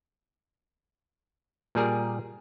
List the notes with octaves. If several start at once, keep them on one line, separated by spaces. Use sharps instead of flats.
A#2 G3 G#4 A#4